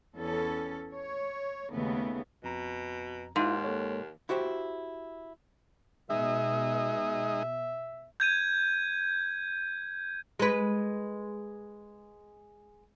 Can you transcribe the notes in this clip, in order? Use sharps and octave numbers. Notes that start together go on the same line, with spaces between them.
E2 C#4 A4
C#5
D#2 C#3 A3 B3
F2 B2 A#5
D#2 G#2 E4 F4 F5
A#3 A4 C#5
E4 F#4 G4 C5
B2 G#3 D#4 E5
G6 G#6 D#7
G#3 B4